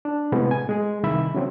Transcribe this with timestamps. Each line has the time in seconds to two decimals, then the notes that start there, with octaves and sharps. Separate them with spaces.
0.05 D4
0.32 A2 C3 G#3 B3
0.51 G#5
0.69 G#3 G#4
1.03 C2 D#3 E5 B5
1.35 C#3 F#3 C4